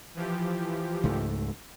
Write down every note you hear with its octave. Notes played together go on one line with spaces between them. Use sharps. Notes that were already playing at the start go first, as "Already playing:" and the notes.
E3 F3 G4
C#2 G#2 A3